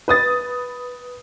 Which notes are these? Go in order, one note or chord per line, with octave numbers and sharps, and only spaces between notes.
B4 D#6 A6